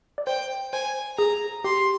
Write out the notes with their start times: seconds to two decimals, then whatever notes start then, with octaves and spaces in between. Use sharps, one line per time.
0.18 D5
0.27 C5 G5
0.73 C5 G#5
1.18 G#4 A#5
1.64 G4 C6